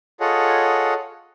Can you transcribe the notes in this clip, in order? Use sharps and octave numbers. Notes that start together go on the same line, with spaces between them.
F4 G#4 A4 C#5 D#5 F#5